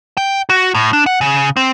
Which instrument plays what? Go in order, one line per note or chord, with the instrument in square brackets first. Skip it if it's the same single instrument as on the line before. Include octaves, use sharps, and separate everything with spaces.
[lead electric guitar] G5
F#4
A2
D4
F#5
C#3
C4